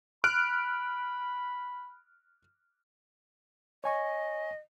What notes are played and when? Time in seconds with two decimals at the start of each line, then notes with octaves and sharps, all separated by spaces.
0.24 B5 F6 F#6 D7
3.84 C#5 D#5 G#5 C#6